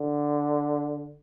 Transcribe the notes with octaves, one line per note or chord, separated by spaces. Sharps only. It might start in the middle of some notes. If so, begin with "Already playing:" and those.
Already playing: D3